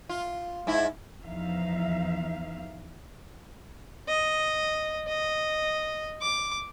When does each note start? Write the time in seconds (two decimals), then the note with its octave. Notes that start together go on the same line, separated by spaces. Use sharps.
0.09 F4
0.67 G#2 E4
1.24 E2 E3 F3 D#4 E5 F5
4.09 D#5
5.08 D#5
6.21 D6